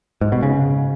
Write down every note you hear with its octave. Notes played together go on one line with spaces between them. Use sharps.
G#2
B2
C#3